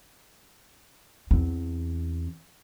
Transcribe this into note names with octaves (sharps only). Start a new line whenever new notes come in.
E2 C4